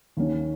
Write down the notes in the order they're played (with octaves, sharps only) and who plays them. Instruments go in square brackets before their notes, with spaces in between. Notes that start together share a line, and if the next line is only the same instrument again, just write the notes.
[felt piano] D#2 D#3 A#3 C#4